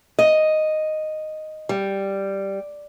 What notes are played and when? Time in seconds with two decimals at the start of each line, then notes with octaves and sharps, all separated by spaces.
0.19 D#5
1.69 G3